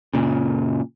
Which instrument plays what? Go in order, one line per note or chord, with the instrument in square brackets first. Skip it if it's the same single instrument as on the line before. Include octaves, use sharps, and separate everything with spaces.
[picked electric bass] F#1 A#2 C#3